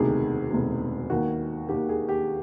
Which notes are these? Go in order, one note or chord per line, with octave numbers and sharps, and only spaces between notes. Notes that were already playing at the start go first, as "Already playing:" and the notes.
Already playing: E1 D2 C3 D#3 G#4
E1 D2 C3 D#3
D#2 D#3 F#4
D#2 D#3 G4
G#4
G4